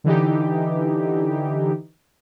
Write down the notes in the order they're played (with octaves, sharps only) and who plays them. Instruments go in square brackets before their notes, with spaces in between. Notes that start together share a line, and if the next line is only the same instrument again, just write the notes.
[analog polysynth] D3 E3 D#4 G4